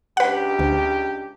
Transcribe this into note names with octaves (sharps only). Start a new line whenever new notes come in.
C#2 D4 G4 B4 F#5
D2